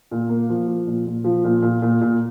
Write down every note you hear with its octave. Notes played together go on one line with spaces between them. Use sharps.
A#2
A#3
F3
F3
A#2
A#2
F3
A#2
A#2
A#2
A#2